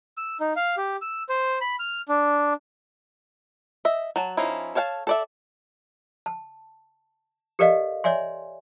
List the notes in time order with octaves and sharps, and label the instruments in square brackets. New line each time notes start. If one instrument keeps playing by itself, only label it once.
[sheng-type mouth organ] E6
D#4
F5
G4
E6
C5
B5
F6
D4
[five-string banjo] D#5 E5
F#3 F#4 A5
F3 C#4 D#4 E4
A4 C#5 F5 F#5 A5
A4 D5 E5
[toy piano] A5
G4 A4 A#4 D5 D#5 F5
C#5 D5 E5 G#5 C6